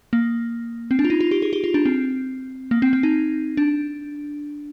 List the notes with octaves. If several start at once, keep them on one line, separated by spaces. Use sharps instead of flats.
A#3
C4
D4
F4
D#4
F4
G4
G#4
G4
F4
D4
C4
A#3
C4
C4
D#4
D4